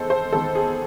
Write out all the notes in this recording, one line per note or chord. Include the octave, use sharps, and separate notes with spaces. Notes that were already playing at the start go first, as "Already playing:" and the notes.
Already playing: E2 D#3 G#3 A4 C5
C5
E2 D#3 G#3 A4
G#4